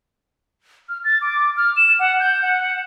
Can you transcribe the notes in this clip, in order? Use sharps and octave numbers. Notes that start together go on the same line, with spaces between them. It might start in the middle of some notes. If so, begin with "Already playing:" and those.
F6
A6
D6
F6
E7
F#5
G6
F#5